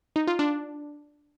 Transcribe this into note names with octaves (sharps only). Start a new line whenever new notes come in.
D#4
F4
D4